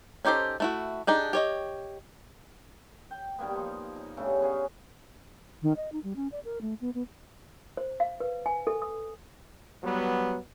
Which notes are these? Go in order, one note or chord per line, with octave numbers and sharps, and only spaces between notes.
C#4 D#4 G4 A4 C5
A3 E4 F#4
D4 D#4 G4 G#4
G4 C#5 D#5
G5
D#3 G3 A#3 B3
F3 D#4
D#4
G2 C#3 A3 F#5
B3 C#4 G#4
D#3
D#5
D#4
G3
C#4
D5
A#4
A3
B3
B3
C5
F5
B4
G#5
A4
D#6
F#3 G3 B3